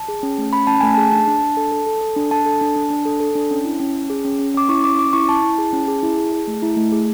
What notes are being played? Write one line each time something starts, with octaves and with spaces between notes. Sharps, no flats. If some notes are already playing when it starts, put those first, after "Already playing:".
Already playing: A5
G#4
C#4
A3
C#4 B5
C#4 A5
A3 G#5
G#4 A5
D4 A5
D4
D4
A4
A4
A4
A4
D4
D4 A5
A4
D4
D4
D4
A4
A4
D4
C#4
E4
C#4
C#4
G#4
C#4
C#4
C#4 D6
E4 C#6
C#4 D6
C#4 D6
E4 C#6
E4 A5
E4
G#4
C#4
G#4
E4
G#4
G#4
A3
E4
A3
G#4